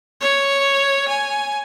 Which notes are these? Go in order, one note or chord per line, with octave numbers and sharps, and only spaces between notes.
C#5
G#5